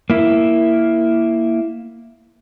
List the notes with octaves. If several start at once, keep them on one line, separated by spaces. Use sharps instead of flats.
A#3 E4